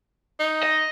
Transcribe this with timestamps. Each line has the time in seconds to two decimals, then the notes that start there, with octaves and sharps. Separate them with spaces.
0.39 D#4
0.63 D#5